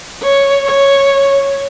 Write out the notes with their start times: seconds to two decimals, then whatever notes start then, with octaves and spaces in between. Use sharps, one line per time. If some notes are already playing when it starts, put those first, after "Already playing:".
0.22 C#5
0.65 C#5